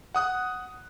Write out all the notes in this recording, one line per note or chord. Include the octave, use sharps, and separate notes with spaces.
F#5 D#6 F#6